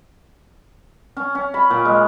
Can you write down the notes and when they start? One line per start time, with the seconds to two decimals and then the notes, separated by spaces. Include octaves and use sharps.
1.17 C#4
1.35 C#4
1.54 B5
1.70 A#2
1.85 G#3